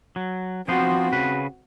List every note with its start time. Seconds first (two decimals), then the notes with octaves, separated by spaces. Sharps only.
0.16 F#3
0.69 F3 B3 C4 F#4 C5
1.13 C#3 B4